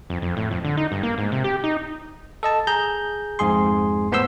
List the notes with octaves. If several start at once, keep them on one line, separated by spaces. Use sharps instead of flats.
F2
F2
A2
F2
D3
D#4
G2
A#3
G#2
C3
G4
D#4
A4 D#5 A5
G#4 A#5 G6
F2 G#2 G#4 C6
A2 B3 C5 C6 E6